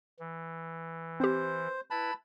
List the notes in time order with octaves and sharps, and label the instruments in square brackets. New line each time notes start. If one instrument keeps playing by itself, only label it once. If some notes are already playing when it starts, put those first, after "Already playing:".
[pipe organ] E3
[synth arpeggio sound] C4 G4 [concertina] C5
[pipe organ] E4 B4 [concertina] A5 B5